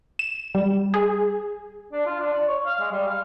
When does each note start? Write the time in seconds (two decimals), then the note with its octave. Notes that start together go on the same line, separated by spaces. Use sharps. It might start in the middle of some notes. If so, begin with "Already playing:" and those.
0.19 E7
0.55 G3
0.94 G#4
1.92 D4
2.06 F4
2.20 D4
2.33 D5
2.48 C#5
2.66 F5
2.80 G#3
2.92 G3
3.07 F5